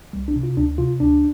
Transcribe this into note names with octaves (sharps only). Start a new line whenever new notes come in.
C2 G3
D4
C3
F4
D2 D4
C3 F4
D2 D4